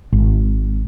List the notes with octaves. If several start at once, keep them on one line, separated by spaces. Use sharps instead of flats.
G#1